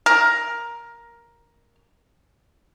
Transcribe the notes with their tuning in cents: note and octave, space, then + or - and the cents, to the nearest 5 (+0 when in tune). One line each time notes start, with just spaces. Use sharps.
A#4 +10